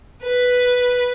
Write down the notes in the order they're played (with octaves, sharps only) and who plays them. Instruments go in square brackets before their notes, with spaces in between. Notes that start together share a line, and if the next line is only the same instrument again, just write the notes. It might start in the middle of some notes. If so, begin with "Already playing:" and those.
[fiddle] B4